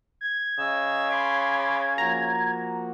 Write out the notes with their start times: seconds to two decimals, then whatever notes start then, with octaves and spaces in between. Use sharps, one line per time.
0.21 G#6
0.59 C#3 D#5 E6
1.11 B5 C6 D6
1.98 F3 A#3 F#4 A#5